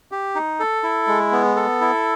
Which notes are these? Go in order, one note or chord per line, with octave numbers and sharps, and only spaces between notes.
G4
D#4
A4
E4
G#3
B3
A4
E4